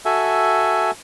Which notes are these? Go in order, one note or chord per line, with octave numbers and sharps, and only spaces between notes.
F#4 A4 E5 G#5